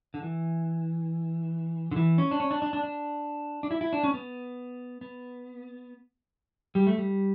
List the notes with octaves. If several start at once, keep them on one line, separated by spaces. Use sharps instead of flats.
D3
E3
D3
E3
C#4
D4
C#4
D4
D4
D4
D4
D4
E4
E4
D4
C#4
B3
B3
G3
A3
G3